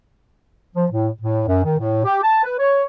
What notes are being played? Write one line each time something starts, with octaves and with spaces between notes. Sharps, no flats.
F3
A2
A2
F#2
D#3
A2
G4
A5
B4
C#5